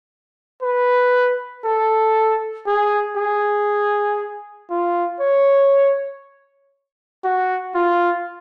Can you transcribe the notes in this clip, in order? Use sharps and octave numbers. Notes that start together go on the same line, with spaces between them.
B4
A4
G#4
G#4
F4
C#5
F#4
F4